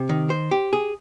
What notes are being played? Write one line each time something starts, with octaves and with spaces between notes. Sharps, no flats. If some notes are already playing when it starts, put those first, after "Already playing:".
Already playing: C3
D#3
C5
G4
G#4